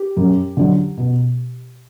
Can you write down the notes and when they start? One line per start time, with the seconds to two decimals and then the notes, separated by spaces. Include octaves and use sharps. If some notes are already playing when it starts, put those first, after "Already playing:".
Already playing: G4
0.17 F#2
0.57 D3 F#3
0.97 B2